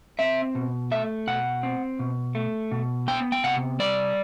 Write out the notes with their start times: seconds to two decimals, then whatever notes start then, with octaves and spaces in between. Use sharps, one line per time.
0.19 C4 E5
0.55 B2
0.91 A3 E5
1.27 B2 F#5
1.63 C4
1.99 B2
2.35 A3
2.72 B2
3.08 B3 G5
3.32 G5
3.44 C3 F#5
3.79 G3 D5